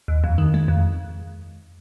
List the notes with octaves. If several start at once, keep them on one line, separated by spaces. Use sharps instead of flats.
D#2
F2
D#3
G#3
F2